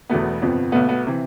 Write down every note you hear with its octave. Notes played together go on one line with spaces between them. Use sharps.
E1 E2 B2 A3 B3
G1 F2 C3 F3 B3
B1 B2 A3 B3
B3
C3 E3